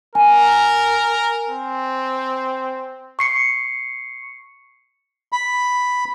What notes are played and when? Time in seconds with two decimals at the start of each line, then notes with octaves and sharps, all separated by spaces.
0.15 A#4 G#5
1.49 C4
3.19 C#6 C7 C#7
5.32 B5